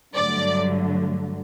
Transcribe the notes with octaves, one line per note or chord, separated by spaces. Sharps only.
G2 D3 F#3 A3 D5